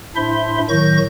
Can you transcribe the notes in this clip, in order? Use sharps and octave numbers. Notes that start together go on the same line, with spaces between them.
A2 D4 E4 C5 E5 C6
A2 D#3 F#3 C#6 G6 A#6